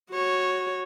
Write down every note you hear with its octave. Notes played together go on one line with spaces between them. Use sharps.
F#4 C#5